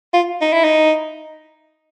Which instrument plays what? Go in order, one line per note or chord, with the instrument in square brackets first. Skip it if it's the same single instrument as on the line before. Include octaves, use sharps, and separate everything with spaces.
[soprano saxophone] F4
D#4
E4
D#4